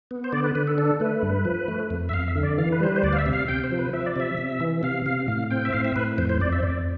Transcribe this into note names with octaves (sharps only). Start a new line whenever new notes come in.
B3
C5
D3 D5
B4
D3 B4
A4
D4 A4
A3 B4
G2
F3
A3
F2
E5
F2 F5
E5
D3
D5
E3 F5
B4
G3 C5
B4
C5
D2 D5
F5
E5
C3
F5
C3 G5
C5
F3
B4
F3 E5
D5
C3 E5
C3
E3
C3 F5
C3 F5
A2 F5
C4 G5
E5
A2 F5
E5
A2 B4
F2 C5
C5
F2 D5
E5
C5
F2 D5